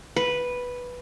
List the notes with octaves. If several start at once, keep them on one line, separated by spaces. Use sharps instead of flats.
B4